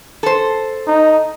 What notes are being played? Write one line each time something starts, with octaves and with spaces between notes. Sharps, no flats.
A4 C5
D#4